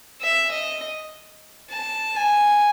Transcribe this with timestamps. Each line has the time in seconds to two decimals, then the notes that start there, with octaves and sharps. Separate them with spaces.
0.22 E5
0.51 D#5
1.71 A5
2.16 G#5